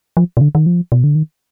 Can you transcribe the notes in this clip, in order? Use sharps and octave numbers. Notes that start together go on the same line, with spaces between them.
F3
B2
D3
D#3
F3
B2
D3
D#3